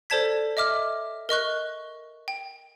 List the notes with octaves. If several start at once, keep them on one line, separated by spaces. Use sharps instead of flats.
A4 C5 D5 A5 G#6 B6
D#5 E5 D6 F6
A#4 D#5 C#6 F#6
G5